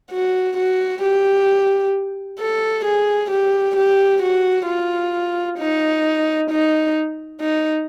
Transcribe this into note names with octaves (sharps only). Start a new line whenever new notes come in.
F#4
F#4
G4
A4
G#4
G4
G4
F#4
F4
D#4
D#4
D#4